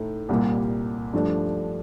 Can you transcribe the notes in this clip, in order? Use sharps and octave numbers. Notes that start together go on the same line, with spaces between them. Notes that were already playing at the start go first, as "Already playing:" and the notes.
Already playing: A2 A3 D#4
C2 A#2 G3 A#3
G2 F3 A3 D4